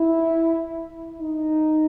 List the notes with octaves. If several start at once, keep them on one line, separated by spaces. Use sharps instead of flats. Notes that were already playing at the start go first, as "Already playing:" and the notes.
Already playing: E4
D#4